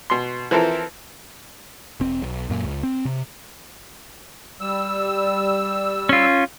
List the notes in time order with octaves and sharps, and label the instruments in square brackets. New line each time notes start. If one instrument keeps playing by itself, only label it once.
[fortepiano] B2 C6
E3 F3 C4 E4 A4 A#4
[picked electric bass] E1 C4
B1
F#2 A#2
C#2
C4
C3
[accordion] G3 E6
[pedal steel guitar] C#4 F4